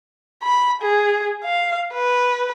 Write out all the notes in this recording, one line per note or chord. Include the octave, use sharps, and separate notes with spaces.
B5
G#4
F5
B4